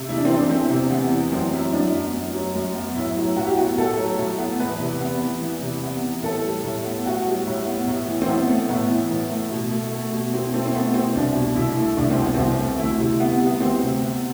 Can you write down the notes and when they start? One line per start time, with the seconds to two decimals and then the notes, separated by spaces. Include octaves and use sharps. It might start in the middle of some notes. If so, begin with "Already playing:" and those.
Already playing: C3
0.09 E2 E4
0.17 D4
0.25 C4
0.29 E3 D4
0.49 E2 C4
0.70 C3
0.90 E2 B3
1.11 E3
1.32 F#2 C4
1.53 F#3 E4
1.73 F#2 D4
1.93 B3
2.13 F#2
2.34 F#3
2.55 F#2
2.75 B3
2.96 A2 E4
3.17 F#3
3.36 A2 F#4
3.46 G4
3.58 B3 F#4
3.78 A2 A4
3.98 F#3
4.19 A2
4.38 B3
4.60 E2 B4
4.80 C3
5.01 B3
5.20 E3
5.42 E2
5.61 C3
5.83 B3
6.03 E3
6.23 A2 A4
6.45 G3
6.64 A2
6.84 B3
7.06 A2 F#4
7.26 G3
7.47 A2
7.66 B3
7.87 A2
8.08 E3
8.22 C4
8.28 A2 B3
8.49 A3
8.69 A2 B3
8.89 E3
9.10 A2
9.31 A3
9.51 B2
9.71 A3
9.93 A3
10.13 B2
10.33 B2 C4
10.53 A3 C4
10.66 C4
10.74 A3 B3
10.94 B2 C4
11.15 C2 D4
11.35 B2
11.56 C2 E4
11.77 A3
11.97 C2 D4
12.10 C4
12.18 B2 B3
12.34 C2 C4
12.59 A3
12.79 D2 E4
12.99 C3
13.20 B3
13.41 G3
13.47 B3
13.60 D2 C4
13.82 C3
14.02 B3